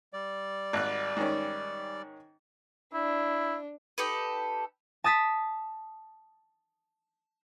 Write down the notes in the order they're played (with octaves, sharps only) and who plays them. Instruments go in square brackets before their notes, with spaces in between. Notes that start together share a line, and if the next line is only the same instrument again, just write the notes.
[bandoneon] G3 D5
[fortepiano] G#1 F#6
G#2 D#3 C#4
[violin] D4 [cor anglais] E4
[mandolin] D#4 G4 A4 B4
[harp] A5 D#6 A6 B6